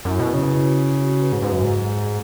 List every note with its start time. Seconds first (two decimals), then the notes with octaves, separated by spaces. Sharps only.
0.05 F#2 E4
0.16 B2 F#4
0.27 G#4
0.34 C#3 B4
0.47 B4
0.69 F#4
0.90 F#4
0.99 G#4
1.10 F#4
1.21 B4
1.32 G#2 G#4
1.42 G#2
1.52 F#2
1.63 G#2
2.04 G#4